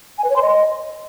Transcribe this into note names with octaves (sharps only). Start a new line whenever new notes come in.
G#5
B4
C#5
C6
D#5